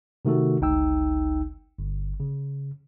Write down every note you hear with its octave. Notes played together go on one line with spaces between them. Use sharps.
C3 D#3 A3 F#4 A4
G1 C#2 D#4 G5 E6
G1
C#3